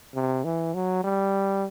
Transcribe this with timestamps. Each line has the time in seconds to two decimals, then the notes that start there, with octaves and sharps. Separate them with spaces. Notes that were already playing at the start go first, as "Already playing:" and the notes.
0.15 C3
0.45 E3
0.75 F#3
1.04 G3